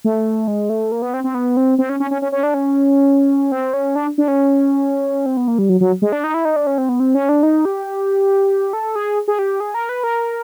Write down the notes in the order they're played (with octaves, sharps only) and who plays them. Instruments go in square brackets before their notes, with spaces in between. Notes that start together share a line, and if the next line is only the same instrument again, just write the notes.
[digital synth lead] A3
G#3
A3
A#3
B3
C4
C4
B3
C4
C4
C#4
C#4
C#4
C#4
C#4
D4
C#4
C4
C#4
D4
D4
C#4
C4
B3
A#3
G3
F#3
F#3
G#3
D4
D#4
E4
D#4
D4
C#4
C4
B3
C4
C#4
D4
D#4
G4
A4
G#4
G#4
G4
G#4
A#4
B4
A#4